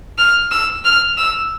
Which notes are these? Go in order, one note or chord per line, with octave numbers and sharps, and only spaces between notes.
F6
E6
F6
E6